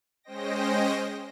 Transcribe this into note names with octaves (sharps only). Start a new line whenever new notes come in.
G#3 C#4 C5 D#5 G5 A#6